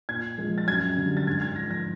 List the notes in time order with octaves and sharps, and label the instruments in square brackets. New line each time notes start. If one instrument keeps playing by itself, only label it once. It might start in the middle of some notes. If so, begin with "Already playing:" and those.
[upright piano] A#2 G#6
F3 G#3
A6
F#2 G#6
D3
G3
A6
G#2 G#6
G#6
F3 G#3 A#6
A#6